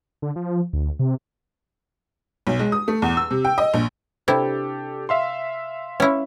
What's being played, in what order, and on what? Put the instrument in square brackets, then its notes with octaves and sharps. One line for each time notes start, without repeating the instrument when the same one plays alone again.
[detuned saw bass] D3
F3
D2
C3
[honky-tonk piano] B1
G#3
D#6
A3
E2
E6
C3
G5
D#5
A#1
[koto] C3 E4 [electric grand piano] D4 G4 A4
[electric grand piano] E5 F5 C6
[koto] C#4 E4